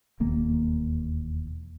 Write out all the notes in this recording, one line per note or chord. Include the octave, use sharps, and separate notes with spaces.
E1 D#2 A#3